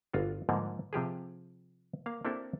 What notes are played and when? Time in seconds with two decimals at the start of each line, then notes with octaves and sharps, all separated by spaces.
0.13 G1 F4 F#4
0.49 G#2 D3 F3 G3 A#3
0.93 C3 F3 G4 G#4
2.06 A#3 F5
2.25 A#3 C4 D4 E4 G4 A4